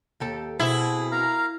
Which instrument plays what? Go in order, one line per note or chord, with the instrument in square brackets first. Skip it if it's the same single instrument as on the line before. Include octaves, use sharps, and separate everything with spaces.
[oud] D#2 G4 A4
[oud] B2 C4 [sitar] E4 [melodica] G#4
[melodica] A#4 F5 A#5